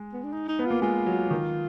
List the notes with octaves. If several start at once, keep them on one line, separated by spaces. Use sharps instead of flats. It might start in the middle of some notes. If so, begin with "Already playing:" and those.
Already playing: G#3
B3
D4
D#4
D#4
B3
A#3 F4
G#3 F4
F#3
D#3